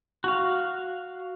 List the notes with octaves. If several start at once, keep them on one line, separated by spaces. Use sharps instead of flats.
F#4 F5